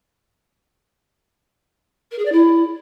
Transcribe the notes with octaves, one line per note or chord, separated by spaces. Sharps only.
A#4
G#4
D5
E4